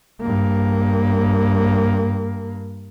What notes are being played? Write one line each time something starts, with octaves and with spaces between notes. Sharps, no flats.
G2 A#3